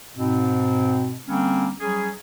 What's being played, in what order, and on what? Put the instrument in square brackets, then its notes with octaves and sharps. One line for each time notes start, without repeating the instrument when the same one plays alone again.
[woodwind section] G#2 B2 C4
D3 G3 A#3 C4 C#4
F#3 G3 C#4 G#4